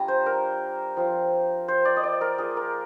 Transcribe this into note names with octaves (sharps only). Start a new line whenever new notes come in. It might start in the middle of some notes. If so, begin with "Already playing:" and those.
Already playing: G3 D4 F4 G#5 A#5
C5
A#4
F3 C4 F4
C5
D5
D#5
D5
A#4
A#3 F4 G#4
A#4